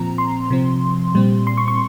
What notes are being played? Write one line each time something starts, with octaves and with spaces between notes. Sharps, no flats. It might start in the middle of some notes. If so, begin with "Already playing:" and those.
Already playing: A#2 F3 C4 A#5
C6
C3 F3 C4
A#2 G3 C4
C6
C#6
C#6